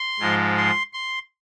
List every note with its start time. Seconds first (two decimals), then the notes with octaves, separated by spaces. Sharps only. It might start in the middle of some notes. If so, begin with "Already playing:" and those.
Already playing: C6
0.19 G#2 F3 G#3
0.57 C6
0.93 C6